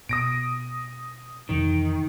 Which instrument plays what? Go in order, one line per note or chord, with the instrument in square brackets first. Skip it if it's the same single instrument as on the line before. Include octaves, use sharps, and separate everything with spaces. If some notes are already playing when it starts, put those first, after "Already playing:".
[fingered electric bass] B2 [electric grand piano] D#6 A#6 D7
[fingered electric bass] F2 C3 E3 [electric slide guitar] D#3